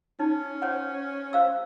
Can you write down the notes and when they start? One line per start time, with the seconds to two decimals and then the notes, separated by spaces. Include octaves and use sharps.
0.20 C#4 D#4
0.62 C5 C#5 F#5
1.33 C5 F5 E6